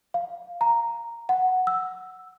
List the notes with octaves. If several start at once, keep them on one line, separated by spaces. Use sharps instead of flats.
F5
A#5
F#5
E6